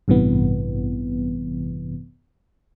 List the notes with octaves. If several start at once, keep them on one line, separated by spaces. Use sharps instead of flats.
A1 G2 C3 E3 B3